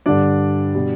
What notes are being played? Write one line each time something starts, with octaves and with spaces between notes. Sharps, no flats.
G2 D3 G3 D4 D5
B2 G3